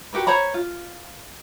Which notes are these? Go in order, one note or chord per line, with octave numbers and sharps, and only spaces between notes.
F#4 G4 A#4 B4
C5 C#5 A#5 B5
F4